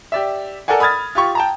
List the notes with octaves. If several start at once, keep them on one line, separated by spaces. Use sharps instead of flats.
G4 D5 E5
A4 A#4 D5 F#5 G#5
B5 D#6 F6 G#6 A6
F4 G4 C#6
G5 A5 A#5